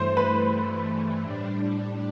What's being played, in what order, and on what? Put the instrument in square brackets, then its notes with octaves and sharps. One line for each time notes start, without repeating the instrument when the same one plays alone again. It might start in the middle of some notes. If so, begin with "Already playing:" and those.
Already playing: [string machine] G2 E3 A3 [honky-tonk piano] C5
[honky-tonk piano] B4
[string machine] A2 G3 D4